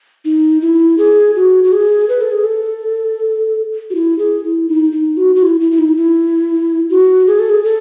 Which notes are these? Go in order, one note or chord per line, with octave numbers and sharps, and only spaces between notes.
D#4
E4
G#4
F#4
F#4
G#4
B4
A4
G#4
A4
F#4
E4
G#4
E4
D#4
D#4
F#4
F#4
E4
E4
E4
D#4
E4
F#4
G#4
A4
G#4
A4